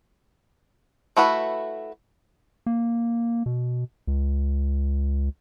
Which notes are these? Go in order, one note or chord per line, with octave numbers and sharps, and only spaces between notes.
A3 E4 F#4 B4
A#3
B2
C#2